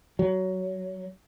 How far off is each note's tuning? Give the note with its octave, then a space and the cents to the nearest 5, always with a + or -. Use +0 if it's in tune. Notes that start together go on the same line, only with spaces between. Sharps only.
F#3 +15